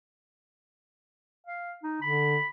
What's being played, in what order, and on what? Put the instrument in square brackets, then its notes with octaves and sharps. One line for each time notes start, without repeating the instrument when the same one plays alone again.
[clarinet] F5
D#4
[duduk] D3 [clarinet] B5